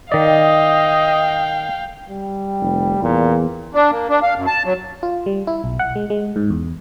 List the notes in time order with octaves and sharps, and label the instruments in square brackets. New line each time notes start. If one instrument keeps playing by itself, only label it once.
[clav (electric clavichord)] D#3 D5 [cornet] D#5 [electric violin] F5 G5
[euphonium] G3
[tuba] F1
[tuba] E2 [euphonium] A#2
[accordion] D4
A#3
D4
F5
F#2
A5
F#3
[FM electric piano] F4
G3
E4
B1
F#5
G#3
G#3
G#2
E2